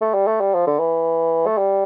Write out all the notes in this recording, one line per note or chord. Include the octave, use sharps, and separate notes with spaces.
A3
G3
A3
G3
F3
D3
E3
A3
G3